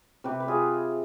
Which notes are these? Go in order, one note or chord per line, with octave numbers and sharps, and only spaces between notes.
C3 G4 B4
B4
F4 G#4